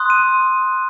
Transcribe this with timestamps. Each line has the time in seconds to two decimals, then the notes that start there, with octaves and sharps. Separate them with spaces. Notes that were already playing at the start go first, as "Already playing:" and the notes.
Already playing: C6 D#6 F#6
0.10 D#7